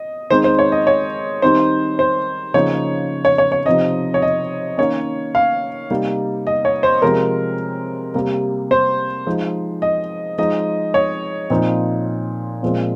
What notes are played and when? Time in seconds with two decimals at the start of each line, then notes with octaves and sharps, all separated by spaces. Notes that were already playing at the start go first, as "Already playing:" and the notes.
Already playing: D#5
0.30 D#3 G#3 C4 D#4 C5
0.44 C5
0.59 C#5
0.72 D#5
0.87 C#5
1.42 D#3 G3 C4 D#4 C5
1.99 C5
2.54 C#3 F3 A#3 D#4 C#5
3.25 C#5
3.38 C#5
3.52 C#5
3.66 C3 F3 C4 D#4 D#5
4.14 C#5
4.22 D#5
4.78 D#3 A#3 C#4 C#5
5.35 F5
5.90 C3 G3 A#3 D#4
6.47 D#5
6.65 C#5
6.83 C5
7.02 C3 F3 G#3 C4 A#4
8.14 C3 G3 A#3
8.71 C5
9.26 F3 G#3 D#4
9.82 D#5
10.38 F3 G#3 D#4 D#5
10.94 C#5
11.50 A#2 F3 C4 D#4
12.63 A#2 F3 G#3 C4